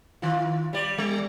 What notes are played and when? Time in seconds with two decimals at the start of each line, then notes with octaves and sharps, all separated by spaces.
0.22 D#3 F4
0.73 G3 D5
0.98 G3